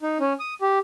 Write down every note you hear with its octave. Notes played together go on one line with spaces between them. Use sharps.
D#4
C#4
D#6
G4